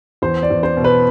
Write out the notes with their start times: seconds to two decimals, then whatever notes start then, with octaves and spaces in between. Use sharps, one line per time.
0.22 E2 C5
0.43 D5
0.50 E2
0.63 C5
0.77 B2
0.84 B4